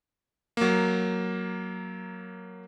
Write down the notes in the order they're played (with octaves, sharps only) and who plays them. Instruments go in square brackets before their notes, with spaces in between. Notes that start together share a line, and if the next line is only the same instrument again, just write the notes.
[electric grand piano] F#3 A#3